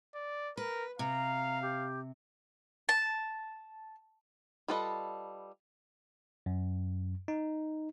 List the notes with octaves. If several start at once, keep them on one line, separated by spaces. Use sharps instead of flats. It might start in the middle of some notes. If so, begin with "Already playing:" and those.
D5
A#4 B4
C3 F5 A#5
G4
A5
G3 F4 A4 B4 D#5
F#2
D#4